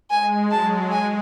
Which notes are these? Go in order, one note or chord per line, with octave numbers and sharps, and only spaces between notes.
G#3 G#5
F#3 A5
G#3 G#5